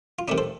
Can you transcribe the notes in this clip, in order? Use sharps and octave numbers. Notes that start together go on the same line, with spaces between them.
F4
C3 D#3 A3 D4 D#4
A4 C5